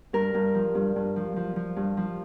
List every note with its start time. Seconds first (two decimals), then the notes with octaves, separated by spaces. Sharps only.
0.13 G2 A#4
0.34 G2
0.54 F3
0.75 G2
0.96 G2
1.16 F3
1.36 F3
1.56 F3
1.76 G2
1.97 F3